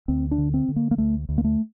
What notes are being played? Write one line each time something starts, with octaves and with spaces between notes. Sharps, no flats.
D2 C4
D4
D3
C4
D3
A#3
A#3
D2 A3
D2
A#3
A3